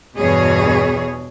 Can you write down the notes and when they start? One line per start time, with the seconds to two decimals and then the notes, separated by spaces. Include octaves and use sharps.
0.18 E2 G2 B2 E3 G#4 C#5